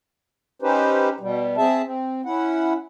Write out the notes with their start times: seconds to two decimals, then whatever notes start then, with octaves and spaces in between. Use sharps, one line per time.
0.62 C#4 D#4 G4 B4 C5
1.20 B2 G3
1.57 C4 G#4 E5 A5
1.85 C4
2.25 C#4 E4 F#5